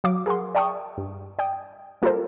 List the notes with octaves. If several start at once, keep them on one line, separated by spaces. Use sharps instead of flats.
F#3 F5 D6
G#4 A#4 F#5 C6
D5 E5 G5 A5 C#6 D#6
G2
D5 G5 D#6
G3 A#3 F4 A4 A#4 C5